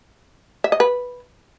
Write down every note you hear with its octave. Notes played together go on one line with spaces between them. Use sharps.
E5
D#5
B4